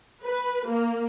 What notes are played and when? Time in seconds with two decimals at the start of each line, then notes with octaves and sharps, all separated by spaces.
0.24 B4
0.68 A#3